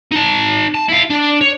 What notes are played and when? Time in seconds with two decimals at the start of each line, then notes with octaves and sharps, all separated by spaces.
0.11 D#4 A5
0.74 A5
0.88 E4 F5
1.10 D4
1.41 C#5